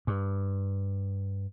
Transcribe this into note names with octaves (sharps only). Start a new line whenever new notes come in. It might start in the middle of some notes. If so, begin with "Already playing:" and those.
G2